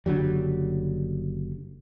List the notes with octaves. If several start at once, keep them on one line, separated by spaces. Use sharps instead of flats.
F#1 D3 F#3 G3